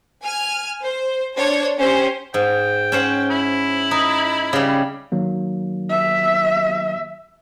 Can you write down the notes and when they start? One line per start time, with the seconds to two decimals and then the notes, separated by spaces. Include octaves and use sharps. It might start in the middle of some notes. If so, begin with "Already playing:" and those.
0.22 G#5 F6
0.81 C5
1.34 D4 C5 C#5
1.78 C#4 G4 C5
2.34 G#2 G5
2.92 C#4 C5 F#5
3.30 E4
3.91 D#4
4.53 C#3 G3
5.12 D#3 F#3 A#3
5.90 E5